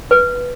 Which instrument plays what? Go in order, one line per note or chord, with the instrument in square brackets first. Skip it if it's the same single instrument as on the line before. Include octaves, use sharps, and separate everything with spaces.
[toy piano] B4